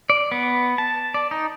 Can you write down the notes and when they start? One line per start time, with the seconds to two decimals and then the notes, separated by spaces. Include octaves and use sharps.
0.10 D5
0.32 B3
0.78 A5
1.14 D5
1.31 D#4